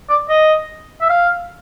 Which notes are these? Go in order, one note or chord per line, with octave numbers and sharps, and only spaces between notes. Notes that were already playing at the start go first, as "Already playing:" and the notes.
D5
D#5
E5
F5